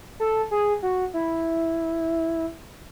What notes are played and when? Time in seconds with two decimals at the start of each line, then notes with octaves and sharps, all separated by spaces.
0.20 A4
0.51 G#4
0.83 F#4
1.14 E4